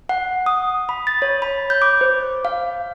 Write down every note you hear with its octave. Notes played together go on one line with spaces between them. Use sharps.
F#5
D#6
B5
A6
C#5
B5
G6
D6
C5
F5